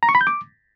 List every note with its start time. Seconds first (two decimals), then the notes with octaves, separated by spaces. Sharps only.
0.03 A#5
0.09 C#6
0.15 B5
0.21 G6
0.27 D6